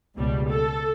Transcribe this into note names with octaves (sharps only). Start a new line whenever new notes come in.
C#2 B2 G3
A4